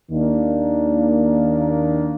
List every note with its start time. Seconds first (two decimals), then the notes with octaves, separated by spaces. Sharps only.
0.11 D#2 D#3 A#3 D4